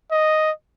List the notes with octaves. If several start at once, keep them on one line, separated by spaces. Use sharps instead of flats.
D#5